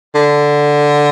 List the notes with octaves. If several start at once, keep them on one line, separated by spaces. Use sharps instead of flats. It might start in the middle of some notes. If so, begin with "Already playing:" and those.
D3